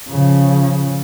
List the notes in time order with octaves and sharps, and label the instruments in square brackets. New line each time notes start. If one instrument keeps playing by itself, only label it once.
[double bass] C#3 F3